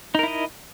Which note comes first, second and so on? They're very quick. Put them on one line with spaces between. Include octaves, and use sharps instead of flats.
D#4 A#4 E4 D#5